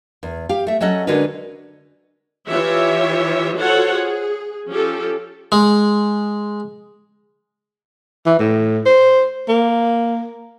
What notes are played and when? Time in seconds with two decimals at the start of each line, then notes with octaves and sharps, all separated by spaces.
0.23 E2
0.49 G4 F5
0.67 A3 E5
0.81 F#3 C#4 A4 D#5 F#5
1.07 D3 G#3 C#4 F#4 A#4 B4
2.49 E3 F4 G4 C#5 E5
3.56 F4 F#4 A4 C5 C#5 F#5
3.93 G#4
4.68 F3 C#4 G4 A4
5.52 G#3
8.26 E3
8.39 A2
8.86 C5
9.48 A#3